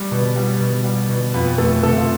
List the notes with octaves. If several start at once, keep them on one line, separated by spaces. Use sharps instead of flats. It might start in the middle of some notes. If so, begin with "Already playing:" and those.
Already playing: G3
B2
G3
B2
G3
B2
F2 B3 B4
F2 A3 A4
C3 A3 A4
F4